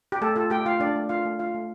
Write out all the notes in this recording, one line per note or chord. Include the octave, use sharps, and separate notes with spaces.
G4
A3 A4
F4 A4
A3 G4 G5
F4 F5
A3 D4 D5
A3
F4 F5
A3
F4 F5
A3